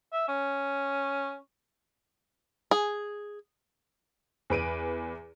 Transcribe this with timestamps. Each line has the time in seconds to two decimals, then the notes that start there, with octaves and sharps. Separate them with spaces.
0.13 E5
0.28 C#4
2.71 G#4
4.50 E2 B4 D7 D#7